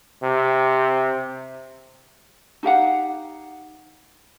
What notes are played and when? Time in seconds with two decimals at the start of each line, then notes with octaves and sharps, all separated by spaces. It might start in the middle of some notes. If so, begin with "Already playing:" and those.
0.23 C3
2.63 D#4 G4 F5 F#5